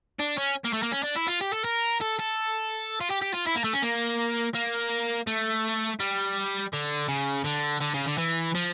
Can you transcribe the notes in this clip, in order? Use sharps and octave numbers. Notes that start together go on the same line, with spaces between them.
D4
C#4
A#3
A3
A#3
C#4
D4
E4
F4
G4
A4
A#4
A4
A4
F4
G4
G4
F4
E4
A#3
A3
C#4
A#3
A#3
A3
G3
D3
C#3
D3
D3
C#3
D3
E3
F3